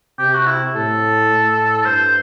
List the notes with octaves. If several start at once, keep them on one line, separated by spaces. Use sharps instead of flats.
C3 G4
F#4
E4
A2 A4
A2
G2 C5